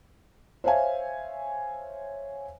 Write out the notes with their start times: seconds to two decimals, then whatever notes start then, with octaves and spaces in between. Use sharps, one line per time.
0.64 C5 C#5 E5 F5 G#5